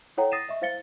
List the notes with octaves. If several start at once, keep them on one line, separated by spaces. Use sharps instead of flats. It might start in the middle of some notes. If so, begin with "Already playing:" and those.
E4 A4 C#5 F#5 G5 A#5
D#6 A6 A#6 C7 D#7 E7
D#5 E5 C#6
E4 C5 F5 A6 C#7 G7